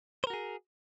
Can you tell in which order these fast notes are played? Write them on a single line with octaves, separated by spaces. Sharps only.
C5 A#4 F#4 G#4